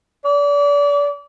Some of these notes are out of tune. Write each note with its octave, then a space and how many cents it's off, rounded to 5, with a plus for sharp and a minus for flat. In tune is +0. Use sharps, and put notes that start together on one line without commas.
D5 -35